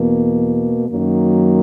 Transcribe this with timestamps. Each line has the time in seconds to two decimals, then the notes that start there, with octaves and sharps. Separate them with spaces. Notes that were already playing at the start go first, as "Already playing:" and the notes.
Already playing: E2 B2 A#3
0.87 F#2 D#3 F#3 A#3